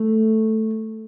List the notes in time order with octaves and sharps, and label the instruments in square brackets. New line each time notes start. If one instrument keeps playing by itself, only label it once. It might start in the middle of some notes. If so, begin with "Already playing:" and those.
Already playing: [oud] A3